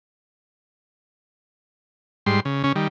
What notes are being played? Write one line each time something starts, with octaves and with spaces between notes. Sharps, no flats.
G#2 G3 C6
C#3
C#3 C#4
D#3 G3